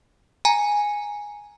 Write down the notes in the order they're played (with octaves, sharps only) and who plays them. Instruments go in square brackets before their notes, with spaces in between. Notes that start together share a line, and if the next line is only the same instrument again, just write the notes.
[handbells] G#5 A#5